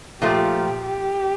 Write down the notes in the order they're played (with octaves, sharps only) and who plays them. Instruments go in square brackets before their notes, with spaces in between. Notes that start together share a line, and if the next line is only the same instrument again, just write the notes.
[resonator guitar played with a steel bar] A#2 F3 A3 [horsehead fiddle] G4
[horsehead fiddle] G4